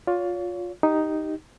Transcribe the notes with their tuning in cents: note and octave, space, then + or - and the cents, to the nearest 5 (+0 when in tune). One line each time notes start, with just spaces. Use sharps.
F4 +20 C#5 +35
D#4 +0 G4 -5